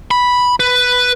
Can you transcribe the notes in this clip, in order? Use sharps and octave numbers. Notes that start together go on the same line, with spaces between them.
B5
B4